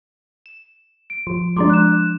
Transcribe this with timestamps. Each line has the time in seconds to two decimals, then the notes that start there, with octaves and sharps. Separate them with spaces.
0.46 E7
1.10 D7
1.27 F3
1.56 F3 G#3 D4 A#5 C6 D6
1.70 F#6 E7